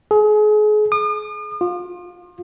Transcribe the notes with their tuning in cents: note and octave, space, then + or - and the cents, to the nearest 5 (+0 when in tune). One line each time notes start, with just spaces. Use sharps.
G#4 +35
D#6 -45
F4 +25